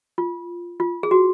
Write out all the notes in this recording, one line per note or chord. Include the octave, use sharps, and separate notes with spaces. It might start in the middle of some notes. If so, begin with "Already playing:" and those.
F4
F4
G#4
F#4